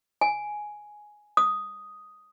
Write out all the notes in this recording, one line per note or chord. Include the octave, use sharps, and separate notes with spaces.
G#5
D#6